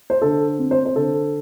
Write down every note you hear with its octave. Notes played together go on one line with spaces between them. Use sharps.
C5
D3 A4
C4
C5
C5
D3 A4